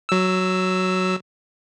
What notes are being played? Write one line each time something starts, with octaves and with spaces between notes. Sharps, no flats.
F#3 E6